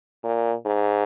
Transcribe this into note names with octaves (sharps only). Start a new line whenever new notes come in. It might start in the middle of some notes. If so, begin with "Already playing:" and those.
A#2
G#2